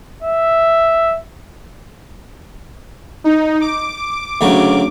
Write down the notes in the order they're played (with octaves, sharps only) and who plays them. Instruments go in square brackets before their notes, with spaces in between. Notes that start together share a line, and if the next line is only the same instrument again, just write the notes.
[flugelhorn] E5
[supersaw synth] D#4
D6
[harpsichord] D2 C#3 F#3